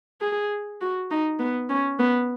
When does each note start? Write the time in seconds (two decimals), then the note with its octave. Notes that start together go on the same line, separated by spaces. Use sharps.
0.21 G#4
0.81 F#4
1.11 D#4
1.40 B3
1.69 C#4
1.99 B3